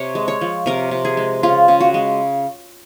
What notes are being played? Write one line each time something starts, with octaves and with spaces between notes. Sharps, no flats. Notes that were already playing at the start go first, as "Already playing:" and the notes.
Already playing: C3 C#5
G#3
C#5
F3
C3 A#4
C3
G#4
G#3
C#3 F4
C#3
F#4
G#3